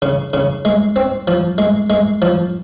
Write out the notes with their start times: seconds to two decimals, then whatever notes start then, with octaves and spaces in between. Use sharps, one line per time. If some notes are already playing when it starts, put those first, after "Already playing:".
0.02 C#3
0.34 C#3
0.65 G#3
0.96 C4
1.28 F3
1.58 G#3
1.90 G#3
2.22 F3